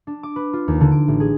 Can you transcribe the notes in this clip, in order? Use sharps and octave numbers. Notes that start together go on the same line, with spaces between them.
D4
D6
B4
F4
D#2
D3
D7
A1
G#4